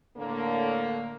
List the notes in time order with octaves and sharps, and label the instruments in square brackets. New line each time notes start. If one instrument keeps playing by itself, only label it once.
[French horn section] A2 D3 A#3